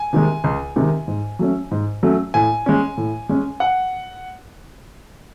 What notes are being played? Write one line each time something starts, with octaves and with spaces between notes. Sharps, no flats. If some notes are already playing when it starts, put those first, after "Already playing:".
Already playing: G#5
C3 D#3 G#3
C#2
C3 D#3 G#3
G#2
F#3 A3 C#4
G#2
F#3 A3 C#4
A2 G#5
G#3 C#4
A2
G#3 C#4
F#5